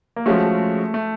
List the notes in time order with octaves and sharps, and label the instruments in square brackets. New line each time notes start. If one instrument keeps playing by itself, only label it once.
[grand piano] A#3
[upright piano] F3 G#3 C#4 F#4 [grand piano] A3
[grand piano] A3